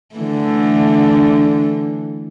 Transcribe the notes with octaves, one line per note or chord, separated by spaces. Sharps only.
D3 E3 A3